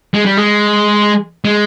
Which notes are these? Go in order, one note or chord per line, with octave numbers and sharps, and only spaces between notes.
G#3
G3
G#3
G#3